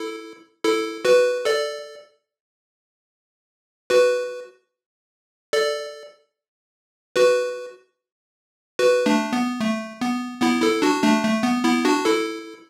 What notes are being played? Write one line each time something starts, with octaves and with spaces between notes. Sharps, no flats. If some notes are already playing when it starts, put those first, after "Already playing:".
Already playing: E4 A4
E4 A4
F#4 B4
A4 D5
F#4 B4
A4 D5
F#4 B4
F#4 B4
A3 D4
B3
A3
B3
B3 E4
E4 A4
D4 F#4
A3 D4
A3
B3
B3 E4
D4 F#4
E4 A4